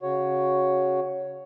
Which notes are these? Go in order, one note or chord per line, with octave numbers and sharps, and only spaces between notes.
C#3 F#4 C#5